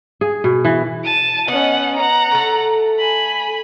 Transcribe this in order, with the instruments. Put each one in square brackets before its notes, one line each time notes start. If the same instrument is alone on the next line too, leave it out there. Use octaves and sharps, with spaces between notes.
[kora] G#4
B2
E3
[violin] A5 D#7
[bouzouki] B3 D#5 [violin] C#4 F#5
[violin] F#5 A#5
[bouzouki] A3 A4
[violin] G#5 B5